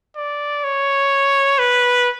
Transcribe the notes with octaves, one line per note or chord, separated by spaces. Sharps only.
D5
C#5
B4